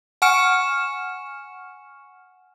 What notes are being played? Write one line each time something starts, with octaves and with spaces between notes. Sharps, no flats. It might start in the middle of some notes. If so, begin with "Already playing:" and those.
F#5 G#5 C#6 F6 C#7 E7